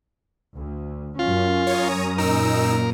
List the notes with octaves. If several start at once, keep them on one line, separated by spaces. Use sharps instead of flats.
D2
F#2 C#4 F4
C#5 A#5 D#6
A#2 D#4 A#4 E6